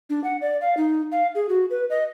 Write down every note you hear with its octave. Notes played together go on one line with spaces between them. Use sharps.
D4
F#5
D5
F5
D#4
F5
G#4
F#4
B4
D#5